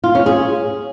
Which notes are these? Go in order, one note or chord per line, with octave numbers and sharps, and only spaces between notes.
F4
C#4
G#4